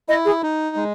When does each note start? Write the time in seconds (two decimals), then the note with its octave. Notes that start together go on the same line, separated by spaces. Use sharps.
0.09 E4 D#5
0.25 G#4
0.43 D#4
0.76 G#3